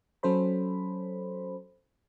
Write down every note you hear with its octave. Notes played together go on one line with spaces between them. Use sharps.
F#3 C#4 A4 C5 B5